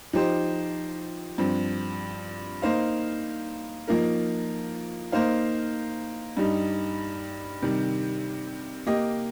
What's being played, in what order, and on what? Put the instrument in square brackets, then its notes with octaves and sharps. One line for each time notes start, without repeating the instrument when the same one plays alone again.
[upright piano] F3 D#4 G4 C5
G2 F3 C4
A#3 D#4 C5 F5
F3 A#3 D#4 A#4
A#3 D#4 C5 F5
G2 G3 D#4
C3 D#3 G3
A#3 G4 D#5